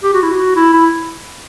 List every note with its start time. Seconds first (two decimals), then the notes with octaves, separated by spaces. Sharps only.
0.03 G4
0.13 F#4
0.22 E4
0.32 F#4
0.56 E4
0.73 E4